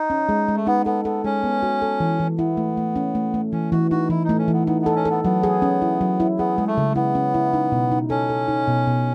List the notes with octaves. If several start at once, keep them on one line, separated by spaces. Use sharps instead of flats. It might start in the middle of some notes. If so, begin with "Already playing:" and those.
Already playing: D#4
C#4
G#3
G#3
A3
B3 D#4
B3 A4
B3 A4
G#3 C#4
B3
F#4
A4
E3
E3
B3 E4
A3
A3
C#4
A3
A3
E3 C#4
E3 F#4
D#4 F#4
E3 E4
A3 D#4
C#4
E3
B3
B3 D#4
B3 A4
C#4
B3 A4
F#3 B3
G#4
C#4
E4
F#3
E4
B3 G#4
G#3
A3
C#3
B3 E4
C#4
E4
D#4
B2
D#4
C#4 A4
A4
D#4
B2
B2